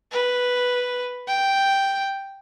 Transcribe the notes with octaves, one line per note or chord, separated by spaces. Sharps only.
B4
G5